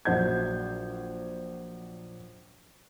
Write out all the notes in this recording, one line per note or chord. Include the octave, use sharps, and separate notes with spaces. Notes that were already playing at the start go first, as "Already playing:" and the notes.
A#1 F#3 C5 F#5 G6 G#6